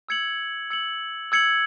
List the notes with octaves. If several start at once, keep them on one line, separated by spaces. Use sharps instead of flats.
E6 G#6 C#7 F#7
E6 G#6 C#7 F#7
E6 G#6 C#7 F#7